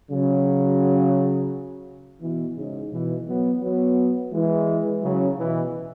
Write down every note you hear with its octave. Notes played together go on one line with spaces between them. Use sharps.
C#3 F#3
B2 E3
G#2 C#3
B2 E3
F#3 B3
F#3 B3
E3 G#3
C#3 F#3
B2 E3